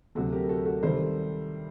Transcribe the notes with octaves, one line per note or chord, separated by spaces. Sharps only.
D2 C3 F#3 F#4 A4
G4 A#4
F#4 A4
F#4 A4
C3 D#3 G3 A4 C5